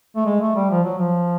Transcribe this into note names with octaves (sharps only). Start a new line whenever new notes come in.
A3
G#3
A3
G3
F3
F#3
F3